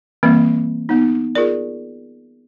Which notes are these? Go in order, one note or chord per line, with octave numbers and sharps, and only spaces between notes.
E3 G3 A#3 C4
B3 D#4
F4 G#4 A#4 D5